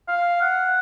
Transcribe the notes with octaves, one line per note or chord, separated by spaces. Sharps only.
F5
F#5